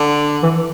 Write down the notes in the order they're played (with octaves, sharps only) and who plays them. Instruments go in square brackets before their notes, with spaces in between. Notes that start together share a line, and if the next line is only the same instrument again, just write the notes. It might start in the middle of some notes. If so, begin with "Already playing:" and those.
Already playing: [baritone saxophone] D3
[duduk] E3